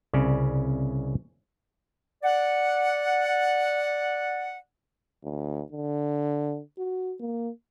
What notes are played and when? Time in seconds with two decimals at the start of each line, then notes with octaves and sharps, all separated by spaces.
0.13 C2 C#3 C#4 D5
2.23 D5 F#5
5.24 D2
5.72 D3
6.78 F#4
7.20 A#3